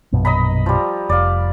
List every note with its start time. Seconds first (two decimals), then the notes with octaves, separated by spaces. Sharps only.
0.12 A#1 F#2 B2
0.25 D#5 A#5 B5
0.66 F3 G3
1.09 F1 D5 F5